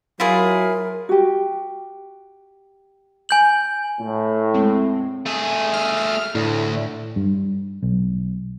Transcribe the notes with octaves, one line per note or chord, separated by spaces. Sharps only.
F#3 E4 F4 G#4 A#4
F#4 G4
G#5 G6 F#7
A2
E2 G#3 C4
A3 G#4
F6
D2 A2
G2
B1